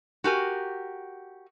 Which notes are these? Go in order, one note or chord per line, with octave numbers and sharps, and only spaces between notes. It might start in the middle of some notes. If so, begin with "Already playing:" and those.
F#4 G4 A#4 G#5